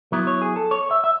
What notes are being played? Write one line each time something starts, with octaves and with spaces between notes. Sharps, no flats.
F#3 B3 E4
C#5
G#4
A4
C#5
E5
E5